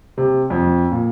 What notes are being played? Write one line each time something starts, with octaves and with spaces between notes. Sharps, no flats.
C3
F2
A#2